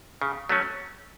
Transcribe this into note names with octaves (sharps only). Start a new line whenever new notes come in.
C#3
F#3 A3 C#4